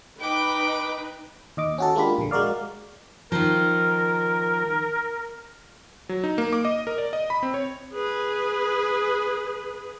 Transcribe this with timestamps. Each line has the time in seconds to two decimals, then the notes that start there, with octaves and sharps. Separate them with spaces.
0.20 D#4 B4 G5 D6
1.57 D#2 D#5 D6
1.78 C#4 F#4 A4
1.95 G#3 A#3 D4 F4 G4 B5
2.18 A#1 D3
2.31 G#3 F#4 A#4 D5 F5
3.32 D#3 F3 A#4
6.09 F#3
6.24 D#4
6.38 A#3
6.53 D6
6.65 D#5
6.87 A#4
6.98 D5
7.13 D#5
7.30 B5
7.43 C4
7.54 C#5
7.93 G#4 B4